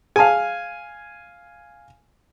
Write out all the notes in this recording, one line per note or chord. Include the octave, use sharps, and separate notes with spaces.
G#4 F5 G#5 A5